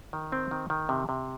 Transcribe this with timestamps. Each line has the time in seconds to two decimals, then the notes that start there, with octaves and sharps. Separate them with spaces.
0.13 D#3
0.32 C4
0.51 D#3
0.70 D#3
0.89 C3
1.09 C3